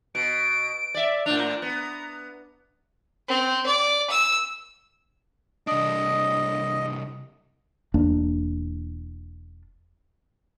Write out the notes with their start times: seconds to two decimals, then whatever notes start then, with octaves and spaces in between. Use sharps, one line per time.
0.15 B2 D7
0.94 D5 E5
1.26 A2 D4 F7
1.39 A#5
1.62 B3
3.28 C4
3.66 D5
4.10 E6
5.67 C2 D4 D#5
7.94 E1 E2 A#3 D4